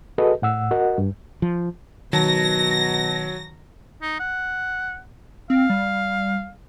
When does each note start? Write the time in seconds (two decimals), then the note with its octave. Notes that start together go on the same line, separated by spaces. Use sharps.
0.18 F#4 G#4 A4 B4 D#5
0.42 A2 F#5 E6
0.71 F#4 A#4 D#5 F#5
0.98 G2
1.42 F3
2.13 B2 D#3 F#3 A5 A#6
4.02 D#4
4.19 F#5
5.50 C4 F5
5.70 G3